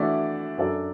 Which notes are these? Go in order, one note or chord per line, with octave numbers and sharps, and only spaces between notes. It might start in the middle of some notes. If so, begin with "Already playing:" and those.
Already playing: E3 A3 D4 F#4 D5
F#2 F#3 D4 A4 D5